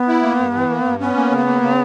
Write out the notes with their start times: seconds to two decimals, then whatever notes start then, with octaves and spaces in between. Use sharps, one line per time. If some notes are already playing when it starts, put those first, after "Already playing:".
Already playing: B3
0.08 E4
0.23 A#3
0.39 G2
0.54 E3
0.70 A#3
0.85 G2
1.00 B3 C#4
1.16 A#3
1.31 C#3
1.46 A#3
1.62 C#3